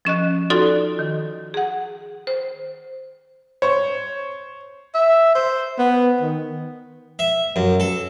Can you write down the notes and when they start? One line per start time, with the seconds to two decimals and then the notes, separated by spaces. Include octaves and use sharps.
0.05 F3 C#4 D#5 F#6
0.50 D#4 F4 F#4 A4 D5 C6
0.99 D#3
1.54 G#4 F#5
2.27 C5
3.62 C5 C#5 C#6
4.94 E5
5.35 C5
5.79 B3
6.21 D#3
7.19 E5
7.56 F#2
7.80 A4